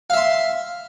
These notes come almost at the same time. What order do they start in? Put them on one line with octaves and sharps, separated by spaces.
F5 E5 C6